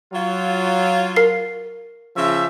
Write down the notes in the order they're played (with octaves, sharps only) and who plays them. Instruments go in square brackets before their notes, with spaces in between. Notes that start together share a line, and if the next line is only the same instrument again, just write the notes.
[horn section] F#3 F4
[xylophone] A#4 C7
[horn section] C#3 F3 E5